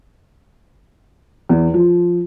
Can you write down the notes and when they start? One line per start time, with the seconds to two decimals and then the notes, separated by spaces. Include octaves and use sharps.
1.49 E2
1.74 F3